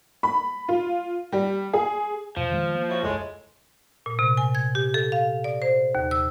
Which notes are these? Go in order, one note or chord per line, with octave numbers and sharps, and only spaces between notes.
B5
F4
G3
G#4
F2 B2 F3
D#3 G#3
A#3
E4 F#4 C#5
F#1 C#2 A2 G#3
A#2
C3
G#5
G#6
G4
A4
F5
D5
C5
D#2
E6